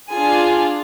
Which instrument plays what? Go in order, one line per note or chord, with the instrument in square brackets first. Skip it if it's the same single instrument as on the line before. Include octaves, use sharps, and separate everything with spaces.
[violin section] D4 F4 G#4 G#5